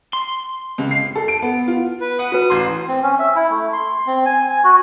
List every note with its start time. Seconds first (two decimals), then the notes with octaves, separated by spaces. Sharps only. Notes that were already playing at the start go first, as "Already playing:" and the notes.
0.13 C6
0.78 C#2
0.91 C7
1.16 A4
1.28 D7
1.42 B3
1.68 F4
2.01 B4
2.19 F#5 D#6
2.32 F#4 B4
2.50 A1 C6
2.88 C4
3.03 C#4
3.19 E5
3.36 E4
3.50 A3
3.73 C6
4.07 C4
4.26 G#5
4.50 G#5
4.64 F#4